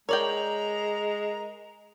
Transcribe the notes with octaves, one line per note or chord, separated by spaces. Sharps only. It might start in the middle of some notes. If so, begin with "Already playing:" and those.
G#3 A#4 C#5 D5 G5 A#5 F#7